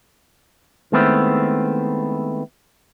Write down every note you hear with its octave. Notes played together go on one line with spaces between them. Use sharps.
D#3 G#3 A3 B3 C4 E4